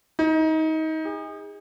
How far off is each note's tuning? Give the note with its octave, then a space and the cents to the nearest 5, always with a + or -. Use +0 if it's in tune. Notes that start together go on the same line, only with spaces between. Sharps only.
D#4 +25
G#4 -30